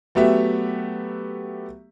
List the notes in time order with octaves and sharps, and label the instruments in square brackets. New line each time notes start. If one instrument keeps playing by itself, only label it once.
[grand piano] F#3 A3 B3 G4 E5